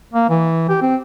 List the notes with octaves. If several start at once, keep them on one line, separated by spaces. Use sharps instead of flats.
A#3
E3
G4
C4